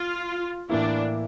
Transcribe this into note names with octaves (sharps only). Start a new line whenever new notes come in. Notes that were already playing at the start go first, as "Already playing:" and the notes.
Already playing: F4
A2 E3 A#3 D4 E4